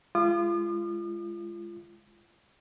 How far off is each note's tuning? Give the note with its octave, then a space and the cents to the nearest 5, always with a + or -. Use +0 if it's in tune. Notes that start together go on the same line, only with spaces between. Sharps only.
G#3 +0 F4 -30 D#6 -45